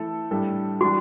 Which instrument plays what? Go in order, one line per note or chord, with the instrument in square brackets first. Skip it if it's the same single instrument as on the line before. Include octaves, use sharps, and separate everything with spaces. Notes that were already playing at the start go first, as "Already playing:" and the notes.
Already playing: [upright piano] E3 A3 E4 A4
A2 G3 D4 A4
[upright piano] E3 G3 D4 [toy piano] F#4